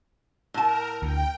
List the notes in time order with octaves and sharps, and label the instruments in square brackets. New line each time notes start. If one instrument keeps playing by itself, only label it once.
[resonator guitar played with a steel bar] A2 A5 [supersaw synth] A#4
[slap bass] D2 [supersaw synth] G5